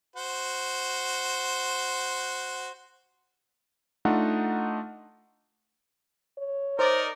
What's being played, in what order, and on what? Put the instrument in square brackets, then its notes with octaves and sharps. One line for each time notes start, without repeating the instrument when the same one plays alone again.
[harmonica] F#4 C5
[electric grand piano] A3 D4 D#4 F4 F#5
[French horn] C#5
[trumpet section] D#4 A#4 D5 [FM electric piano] C5